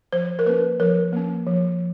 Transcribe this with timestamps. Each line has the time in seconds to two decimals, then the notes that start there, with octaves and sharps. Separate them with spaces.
0.13 F3 C5
0.39 A#4
0.46 A#3 C#4 B4
0.80 F3 A#4
1.13 A#3 C#4
1.47 F3